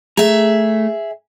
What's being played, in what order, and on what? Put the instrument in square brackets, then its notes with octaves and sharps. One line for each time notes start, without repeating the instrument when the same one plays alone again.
[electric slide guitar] A3 A#5 [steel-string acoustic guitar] G#4 E5